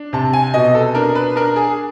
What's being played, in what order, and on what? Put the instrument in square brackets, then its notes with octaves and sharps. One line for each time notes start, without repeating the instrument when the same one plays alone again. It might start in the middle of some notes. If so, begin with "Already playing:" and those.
Already playing: [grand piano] D4
C3 A5
G#5
B2 D#5
A4
D4 A#4
B4
D4 A#4
G#4